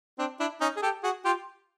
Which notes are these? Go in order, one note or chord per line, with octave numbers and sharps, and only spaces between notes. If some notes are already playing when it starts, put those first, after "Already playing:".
C4 D4
D4 E4
C#4 D#4
G#4
G4 A4
F#4 G#4
F4 G4